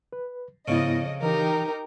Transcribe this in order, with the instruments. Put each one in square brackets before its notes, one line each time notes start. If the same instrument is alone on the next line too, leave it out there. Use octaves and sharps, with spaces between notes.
[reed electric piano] B4
[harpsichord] F2 C#3 [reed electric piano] G#2 B3 E4 [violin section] D#5
[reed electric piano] E3 [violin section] D#4 G4 A#4